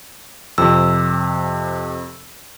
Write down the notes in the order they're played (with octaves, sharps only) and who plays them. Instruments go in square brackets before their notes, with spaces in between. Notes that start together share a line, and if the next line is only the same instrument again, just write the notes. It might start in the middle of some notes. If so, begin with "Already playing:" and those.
[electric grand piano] F2 C3 [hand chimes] E6